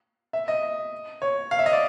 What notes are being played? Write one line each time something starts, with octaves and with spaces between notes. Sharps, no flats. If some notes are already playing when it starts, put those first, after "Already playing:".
E5
D#5
C#5
F5
E5
D#5
D5